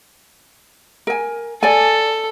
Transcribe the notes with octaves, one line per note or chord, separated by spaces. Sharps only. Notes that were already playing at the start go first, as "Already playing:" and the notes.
A#4 G#5
A4 D5 G#5